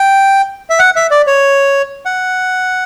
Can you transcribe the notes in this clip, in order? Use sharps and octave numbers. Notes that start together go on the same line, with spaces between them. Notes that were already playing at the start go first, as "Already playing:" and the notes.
Already playing: G5
E5
F#5
E5
D5
C#5
F#5